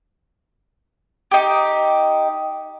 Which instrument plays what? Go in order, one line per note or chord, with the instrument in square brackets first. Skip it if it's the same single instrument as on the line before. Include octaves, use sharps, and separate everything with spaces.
[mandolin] D#4 G4